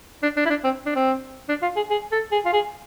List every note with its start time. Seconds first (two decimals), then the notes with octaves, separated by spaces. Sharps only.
0.23 D4
0.36 D4
0.46 E4
0.50 D4
0.64 C4
0.86 D4
0.96 C4
1.49 D4
1.62 F4
1.76 G#4
1.91 G#4
2.12 A4
2.32 G#4
2.45 F4
2.53 G#4